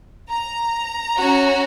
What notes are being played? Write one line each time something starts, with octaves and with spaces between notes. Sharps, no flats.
A#5
C#4 F#4